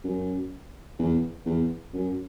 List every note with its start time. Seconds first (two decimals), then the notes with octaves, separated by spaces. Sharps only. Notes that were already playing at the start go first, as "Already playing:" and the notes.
0.04 F#2
0.99 E2
1.45 E2
1.93 F#2